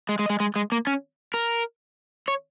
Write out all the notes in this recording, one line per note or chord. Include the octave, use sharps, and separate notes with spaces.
G#3
G#3
G#3
G#3
G#3
A#3
C#4
A#4
C#5